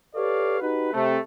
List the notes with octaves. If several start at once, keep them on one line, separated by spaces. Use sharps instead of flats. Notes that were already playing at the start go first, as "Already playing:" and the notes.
G4 A4 B4 C#5 D5 F5
D#4 F#4 G4 B4
C3 A3